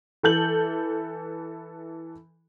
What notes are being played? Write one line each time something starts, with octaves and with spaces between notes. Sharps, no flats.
E3 A4 G6 F#7